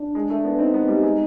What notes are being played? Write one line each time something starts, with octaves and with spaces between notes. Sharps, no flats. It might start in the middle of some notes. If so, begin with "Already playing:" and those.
Already playing: D4
G#3
A3
B3
C4 D#4
B3
G3
G#3